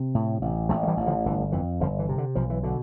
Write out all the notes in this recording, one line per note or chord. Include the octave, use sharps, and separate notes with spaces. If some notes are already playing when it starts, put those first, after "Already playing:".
Already playing: C3
A2
A1
A1 F3 A3
A3
E3 G3
A1
D3 F3
G1 E3
F2 E3
G1 D3 F3
E3
C3
D3
B1 F3
E3
B2 D3